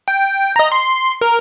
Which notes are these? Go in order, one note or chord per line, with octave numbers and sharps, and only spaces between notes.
G5
D#5 A#5
C6
A#4